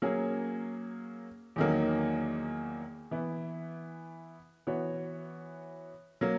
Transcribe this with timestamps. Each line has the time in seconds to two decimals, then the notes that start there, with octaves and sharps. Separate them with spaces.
0.02 F#3 A#3 C#4 G#4
1.56 E2 D#3 F#3 A#3
3.11 E3 B3 E4
4.67 E3 B3 F#4 C#5
6.21 F#3 A#3